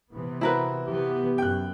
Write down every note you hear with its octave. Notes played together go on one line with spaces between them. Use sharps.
C3 E3 B3
C4 E4 F#4 A#4 B4
C3 E3 B3 G4
F#2 G5 F#6